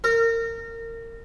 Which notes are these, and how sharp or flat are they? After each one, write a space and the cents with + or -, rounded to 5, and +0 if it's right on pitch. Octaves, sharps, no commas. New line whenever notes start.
A#4 -25